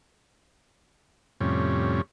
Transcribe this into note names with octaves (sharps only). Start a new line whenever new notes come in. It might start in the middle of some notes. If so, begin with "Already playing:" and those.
F2 A2 C3 G3 C#4